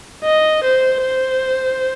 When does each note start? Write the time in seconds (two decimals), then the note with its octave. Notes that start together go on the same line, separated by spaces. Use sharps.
0.24 D#5
0.64 C5
1.02 C5